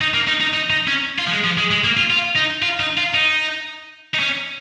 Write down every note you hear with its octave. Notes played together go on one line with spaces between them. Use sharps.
D#4
A#3
D#4
D#4
D#4
D#4
C#4
F4
F3
G#3
F3
G#3
G#3
A#3
F4
F4
D#4
F4
D#4
F4
D#4
D#4
C#4